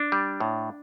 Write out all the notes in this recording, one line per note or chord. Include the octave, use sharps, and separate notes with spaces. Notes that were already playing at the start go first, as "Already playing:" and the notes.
Already playing: D4
G3
A2